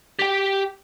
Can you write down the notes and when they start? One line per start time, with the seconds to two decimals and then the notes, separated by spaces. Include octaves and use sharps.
0.19 G4 G5